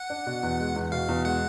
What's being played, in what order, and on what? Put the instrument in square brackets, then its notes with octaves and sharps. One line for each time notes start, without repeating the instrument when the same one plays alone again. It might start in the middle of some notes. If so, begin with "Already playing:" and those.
Already playing: [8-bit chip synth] F#5
[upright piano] D4
B2
E2
G#3
E2
[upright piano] B2 [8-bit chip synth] F5
[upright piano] E2
[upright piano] G#3 [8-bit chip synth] F#5